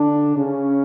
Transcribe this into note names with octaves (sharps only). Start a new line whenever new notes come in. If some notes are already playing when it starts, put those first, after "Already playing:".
Already playing: D3 D4
C#3 C#4